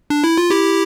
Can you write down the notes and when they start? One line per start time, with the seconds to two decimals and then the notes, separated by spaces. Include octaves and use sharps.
0.10 D4
0.24 E4
0.38 F4
0.50 E4 G4